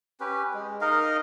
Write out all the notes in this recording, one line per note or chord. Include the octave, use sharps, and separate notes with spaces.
C#4 G4 B4
G#3
D#4 A#4 D#5 F5